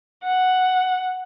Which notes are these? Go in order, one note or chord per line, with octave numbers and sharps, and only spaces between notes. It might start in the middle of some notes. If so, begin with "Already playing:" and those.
F#5